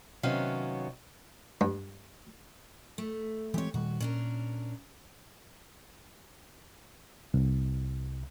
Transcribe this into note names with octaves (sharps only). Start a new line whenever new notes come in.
C3 D#3 F#3 B3 C#4 F5
G2
A3
E3 G#3 C4 G4 C#5
A#2 D#3 G3 F#4
A#2 C#4 D4 A#4
C2